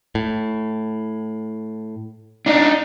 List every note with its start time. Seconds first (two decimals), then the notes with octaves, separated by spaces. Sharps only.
0.15 A2
2.46 D4 D#4